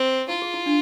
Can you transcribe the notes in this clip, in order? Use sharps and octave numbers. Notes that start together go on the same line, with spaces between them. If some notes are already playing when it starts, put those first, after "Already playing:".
Already playing: C4
E4 F4
G#4
E4
D4